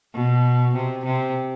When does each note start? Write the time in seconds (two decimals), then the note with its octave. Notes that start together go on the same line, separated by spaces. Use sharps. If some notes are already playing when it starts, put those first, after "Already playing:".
0.13 B2
0.74 C3
1.05 C3